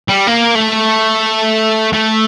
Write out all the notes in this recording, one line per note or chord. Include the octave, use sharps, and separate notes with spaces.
G3
A#3
A3
A3